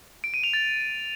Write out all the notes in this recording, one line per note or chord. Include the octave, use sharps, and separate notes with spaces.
D7
D#7
F7
A6